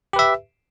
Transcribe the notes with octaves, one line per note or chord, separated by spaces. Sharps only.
G4 B4 E5